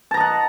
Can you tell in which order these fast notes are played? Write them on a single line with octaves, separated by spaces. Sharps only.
A5 A#5 D#5 F#5